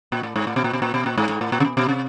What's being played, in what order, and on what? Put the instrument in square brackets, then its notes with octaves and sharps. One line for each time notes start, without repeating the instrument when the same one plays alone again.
[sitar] A#2
A2
G#2
A2
B2
A#2
B2
A#2
B2
A#2
G#2
G#2
A2
A#2
C3
B2
B2
C3